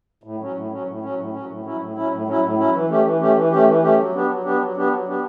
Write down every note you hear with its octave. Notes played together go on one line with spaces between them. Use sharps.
A2
F#3 C#4
A2
F#3 C#4
A2
F#3 C#4
A2
F#3 C#4
A2
F#3 C#4 E4
A2
F#3 C#4 E4
A2
F#3 C#4 E4
A2
F#3 C#4 E4
E3
A3 C#4 G4
E3
A3 C#4 G4
E3
A3 C#4 G4
E3
A3 C#4 G4
F#3
B3 D4 G4
F#3
B3 D4 G4
F#3
B3 D4 G4
F#3
B3 D4 G4